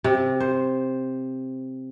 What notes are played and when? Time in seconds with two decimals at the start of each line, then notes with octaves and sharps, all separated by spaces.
0.04 C3
0.40 C5